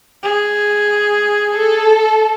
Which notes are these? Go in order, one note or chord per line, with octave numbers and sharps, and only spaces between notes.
G#4
A4